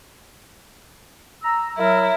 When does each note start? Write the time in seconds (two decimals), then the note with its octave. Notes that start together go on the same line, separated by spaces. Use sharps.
1.43 A#5 E6
1.77 F#3 E4 A#4